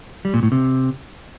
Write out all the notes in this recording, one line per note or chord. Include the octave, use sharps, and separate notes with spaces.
G3
A#2
A2
C3